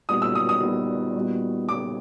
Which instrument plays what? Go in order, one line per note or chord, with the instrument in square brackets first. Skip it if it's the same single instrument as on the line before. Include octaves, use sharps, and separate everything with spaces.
[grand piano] A#2 G3 B3 D#4 F#4 [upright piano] D#6
[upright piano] E6
D#6
D#6
[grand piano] A#2 G3 B3 D#4 F#4
A#2 G3 B3 D#4 F#4
[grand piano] A#2 G3 B3 D#4 F#4 [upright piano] D6